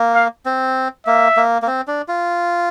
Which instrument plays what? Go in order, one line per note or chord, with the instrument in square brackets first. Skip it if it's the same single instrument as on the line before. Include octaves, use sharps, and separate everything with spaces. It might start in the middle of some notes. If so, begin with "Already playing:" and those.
Already playing: [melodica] A#3
[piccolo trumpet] F5
[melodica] C4
[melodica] A#3 [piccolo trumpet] E5
[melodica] A#3
A#3
C4
D4
F4